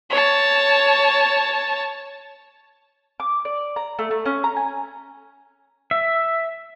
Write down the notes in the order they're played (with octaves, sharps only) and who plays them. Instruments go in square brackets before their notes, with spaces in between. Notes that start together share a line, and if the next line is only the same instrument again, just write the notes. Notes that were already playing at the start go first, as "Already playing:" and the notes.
[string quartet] C#5 A5
[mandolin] D6
D5
A#5
A3
A3
C#4
A#5
G#5
[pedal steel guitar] E5